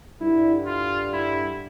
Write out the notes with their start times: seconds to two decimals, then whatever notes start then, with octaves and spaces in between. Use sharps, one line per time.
0.20 G2 D3 G3 E4
0.67 F4
1.13 E4